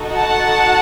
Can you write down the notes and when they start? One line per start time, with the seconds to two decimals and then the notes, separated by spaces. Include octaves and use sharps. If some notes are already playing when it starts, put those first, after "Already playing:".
Already playing: D#4 F#4 A4
0.14 F#5 A5